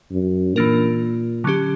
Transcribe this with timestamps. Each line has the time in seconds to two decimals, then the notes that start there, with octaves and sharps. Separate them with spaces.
0.11 F#2
0.55 A#2 E3 A#3 D4 A#4
1.44 D3 F#3 C#4 G4